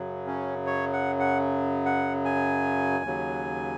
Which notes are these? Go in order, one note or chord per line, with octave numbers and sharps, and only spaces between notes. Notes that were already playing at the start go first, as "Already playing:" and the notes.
Already playing: F#2 C#3 F#3
C#4
C#5
F#5
F#5
F#5
G#5
D#2 C#3 F#3